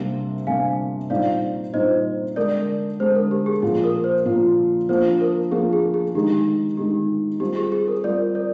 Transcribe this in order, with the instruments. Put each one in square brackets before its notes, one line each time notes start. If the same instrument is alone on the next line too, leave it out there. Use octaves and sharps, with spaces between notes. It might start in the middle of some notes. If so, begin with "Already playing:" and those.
Already playing: [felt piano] C3 G3 A#3 D4
[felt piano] C3 G3 A#3 D4 [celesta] F5 G#5
[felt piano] A#2 G3 C4 D#4 [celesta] D5 F5
[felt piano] A#2 G3 C4 D#4 [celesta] C5 D#5
[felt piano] D3 G#3 D4 [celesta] A#4 D5
[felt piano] D3 G#3 D4 [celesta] C5
[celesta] A#4
G4
G#4
[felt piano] A#2 F3 A#3 F4 [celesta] G#4
[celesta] A#4
C5
[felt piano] A#2 F3 A#3 F4
[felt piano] F3 A#3 D4 [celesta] C5
[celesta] A#4
[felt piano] F3 A#3 D4 [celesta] G#4
[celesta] G#4
G#4
[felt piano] D#3 G#3 D#4 [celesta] G4
[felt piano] D#3 G#3 D#4 [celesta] G4
[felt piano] G3 C4 F4 [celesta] G4
[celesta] G#4
G#4
A#4
[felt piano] G3 C4 F4 [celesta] A#4 D5
[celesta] A#4 D5